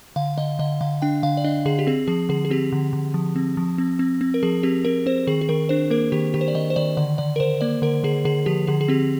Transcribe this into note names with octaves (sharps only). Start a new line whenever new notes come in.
D3 F5
D3 D#5
D3 D#5
D3 F5
D4 G5
D3 F5
D5
D4 D#5
D3 G#4
G4
C4 G#4
F3 G#4
D3 G#4
G#4
C4 G4
D3
D3
F3
C4
F3
C4
C4
C4
A#4
F3 G#4
C4 G4
C4 A#4
C4 C5
D#3 G#4
G#4
D#3 A#4
D4 C5
A#3 A#4
D#3 G4
D#3 G4
C5
D5
D#3 D#5
C5
D#3 D5
D3 D5
D3 D5
A#4
D3 C5
A#3 D5
D3 A#4
D3 G#4
D3 G#4
F3 G4
D3 G#4
G#4
C4 G4